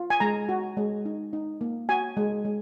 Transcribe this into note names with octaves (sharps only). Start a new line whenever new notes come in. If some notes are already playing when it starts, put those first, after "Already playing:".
Already playing: F4
G#5
G#3 A#5
F#4
G#3
D#4
D#4
A#3
F#4 G#5
G#3
G#3